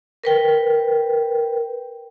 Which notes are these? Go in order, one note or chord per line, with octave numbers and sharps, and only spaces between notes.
A#4 B4 G5